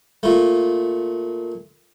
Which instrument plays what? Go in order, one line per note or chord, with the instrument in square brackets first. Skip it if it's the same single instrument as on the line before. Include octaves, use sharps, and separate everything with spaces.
[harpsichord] A#2 A3